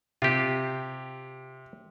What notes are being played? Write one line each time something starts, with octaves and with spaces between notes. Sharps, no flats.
C3 F4 G4